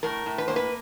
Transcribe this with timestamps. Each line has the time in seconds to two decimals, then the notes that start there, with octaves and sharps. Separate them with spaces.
0.03 A2 A#4
0.26 A2
0.38 B4
0.48 A#3 C5
0.56 B4